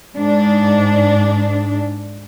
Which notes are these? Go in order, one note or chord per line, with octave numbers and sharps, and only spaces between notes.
G#2 D4